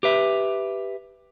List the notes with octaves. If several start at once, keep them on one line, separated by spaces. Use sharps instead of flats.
G4 B4 E5